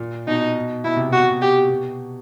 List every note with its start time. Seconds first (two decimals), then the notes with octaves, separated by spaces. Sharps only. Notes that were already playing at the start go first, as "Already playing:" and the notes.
Already playing: A#2
0.27 B2 D#4
0.84 B2 E4
0.97 C3
1.08 B2 F#4
1.20 C3
1.32 B2
1.42 G4
1.70 B2